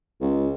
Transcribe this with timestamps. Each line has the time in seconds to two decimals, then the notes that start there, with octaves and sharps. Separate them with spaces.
0.21 C#2